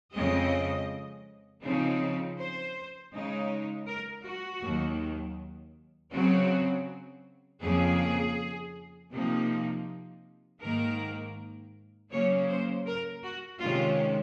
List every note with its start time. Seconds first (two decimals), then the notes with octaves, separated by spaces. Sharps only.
0.13 F2 C#3 G#3 C4 D#5
1.63 C#3 F3 C4 D#4
2.37 C5
3.12 C#3 G#3 D#4
3.87 A#4
4.25 F#4
4.61 D#2 D#3 F#3
6.12 C#3 F#3 C4 F#4
7.61 F2 C#3 F3 A#3 G#4
9.12 C3 F3 A#3 D#4
10.61 G#2 D#3 A#3 A#4
12.11 C#3 F#3 A#3 C#4 C#5
12.48 C5
12.86 A#4
13.23 F#4
13.60 C3 D#3 G#3 C#4 F4